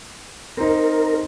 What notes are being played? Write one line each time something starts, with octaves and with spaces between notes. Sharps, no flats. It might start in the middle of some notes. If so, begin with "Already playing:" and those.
C4 D#4 A#4